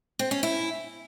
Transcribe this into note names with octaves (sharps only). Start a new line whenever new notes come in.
C4
C#4
E4